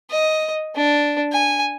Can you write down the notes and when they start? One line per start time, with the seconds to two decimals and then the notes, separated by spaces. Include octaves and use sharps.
0.11 D#5
0.75 D4
1.32 G#5